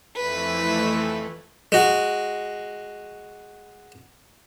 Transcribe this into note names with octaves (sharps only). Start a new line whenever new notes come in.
F2 E3 A3 B4
G#3 F#4